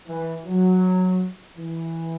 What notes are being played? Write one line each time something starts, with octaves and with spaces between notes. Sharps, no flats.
E3
F#3
E3